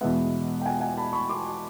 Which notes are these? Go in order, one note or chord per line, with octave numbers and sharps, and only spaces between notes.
E2 B2 G#3 B3 E5 F#5
G5
F#5 G#5
F#5 G#5
A5 B5
B5 C#6
C6 D6